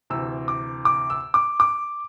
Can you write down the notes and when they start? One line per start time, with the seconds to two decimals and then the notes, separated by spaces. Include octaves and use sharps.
0.10 D2 C3 E3 E6
0.48 D6
0.85 D6
1.10 E6
1.34 D6
1.60 D6